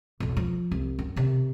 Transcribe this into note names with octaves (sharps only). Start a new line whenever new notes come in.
B1 E2
F3
C2
F#2
C3 D#3